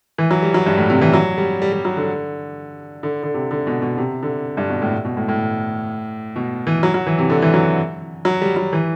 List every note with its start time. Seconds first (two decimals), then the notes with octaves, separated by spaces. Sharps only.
0.18 E3
0.31 F#3
0.42 G3
0.54 F#3
0.66 G2
0.78 A2
0.90 C3
1.01 E3
1.14 F#3
1.38 G3
1.62 G3
1.73 G3
1.85 F#3
1.97 D3
3.03 D3
3.23 D3
3.34 C3
3.51 D3
3.67 B2
3.82 B2
3.98 C3
4.23 D3
4.57 G2
4.69 B2
4.82 A2
5.05 B2
5.17 A2
5.28 A2
6.36 B2
6.67 E3
6.83 F#3
6.94 F#3
7.07 E3
7.19 C3
7.30 D3
7.42 E3
7.54 F#3
8.25 F#3
8.42 G3
8.57 F#3
8.73 E3